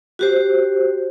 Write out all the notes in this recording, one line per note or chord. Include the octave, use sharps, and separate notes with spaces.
F#4 G4 C5